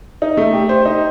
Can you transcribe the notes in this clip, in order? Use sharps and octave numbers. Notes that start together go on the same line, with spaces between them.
D#4
A3
G4
C5
D#4